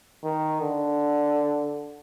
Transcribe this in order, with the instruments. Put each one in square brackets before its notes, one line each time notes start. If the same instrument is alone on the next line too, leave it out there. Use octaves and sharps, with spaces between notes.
[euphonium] D#3
D3